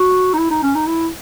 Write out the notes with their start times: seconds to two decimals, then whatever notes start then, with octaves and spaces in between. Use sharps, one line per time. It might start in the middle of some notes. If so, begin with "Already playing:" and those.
Already playing: F#4
0.33 D#4
0.38 E4
0.50 D#4
0.63 C#4
0.75 D#4
0.87 E4